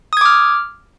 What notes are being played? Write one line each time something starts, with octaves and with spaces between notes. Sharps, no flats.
D6 D#6 F6 G#6